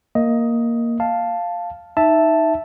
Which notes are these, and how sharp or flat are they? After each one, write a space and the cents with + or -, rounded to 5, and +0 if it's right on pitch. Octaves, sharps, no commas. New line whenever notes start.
A#3 +0 D#5 +10
F5 +0 A5 +0
D#4 +0 E5 +0 A5 +0